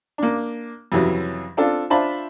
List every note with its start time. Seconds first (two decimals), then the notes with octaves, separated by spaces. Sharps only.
0.18 A#3 D4
0.92 F2 C3 E3 F#3 C#4
1.57 C4 D4 F4 A4
1.90 D4 F4 C5 E5 A5 B5